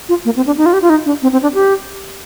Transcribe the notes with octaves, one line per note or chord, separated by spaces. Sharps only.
F4
A#3
C4
D4
D#4
F4
G4
F4
D#4
D4
C4
C4
D4
G4